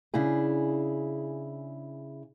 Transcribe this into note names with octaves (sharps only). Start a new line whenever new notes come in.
C#3 D4 E4 G#4